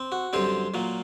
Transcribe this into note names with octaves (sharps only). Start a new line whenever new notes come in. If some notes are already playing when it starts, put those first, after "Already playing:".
Already playing: C4
F#4
F#2 D3 G3 C4 C5
A#2 F#3 A#3